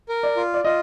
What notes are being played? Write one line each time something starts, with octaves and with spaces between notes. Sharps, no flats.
A#4
D5
F4
D5
F4 D#5